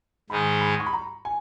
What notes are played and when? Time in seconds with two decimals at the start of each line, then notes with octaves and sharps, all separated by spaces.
0.30 G#2 D#3 G#3 D#4 G#4 B5
0.61 B5
0.72 D#6
0.80 C#6
0.86 B5
0.93 A#5
1.25 G#5